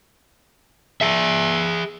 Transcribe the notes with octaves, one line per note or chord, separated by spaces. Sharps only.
G#4 E5